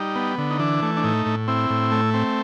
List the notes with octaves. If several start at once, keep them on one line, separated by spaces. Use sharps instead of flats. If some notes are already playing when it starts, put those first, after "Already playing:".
Already playing: G3 D#4
B3
D3
D#4
E3 D4
A3
D4
A2 D#4
A2
C4 E4
A2
A3
C4